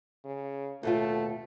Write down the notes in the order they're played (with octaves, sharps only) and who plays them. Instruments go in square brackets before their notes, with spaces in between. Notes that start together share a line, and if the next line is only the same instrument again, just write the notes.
[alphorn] C#3
[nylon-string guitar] D#2 B2 F4 [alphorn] A3